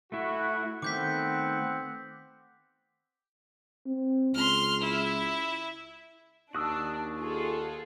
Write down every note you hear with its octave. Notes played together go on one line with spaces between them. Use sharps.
A3 E4 F#4
D#3 A3 B3 C4 F#5 D6 G6 B6
C4
C#2 C6 F6
E4
D#2 D4 F#4 D#6 E6
F4 G#4 A4